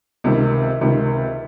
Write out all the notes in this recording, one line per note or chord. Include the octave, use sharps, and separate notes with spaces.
C#2 C3 D#3
C#2 C3 D#3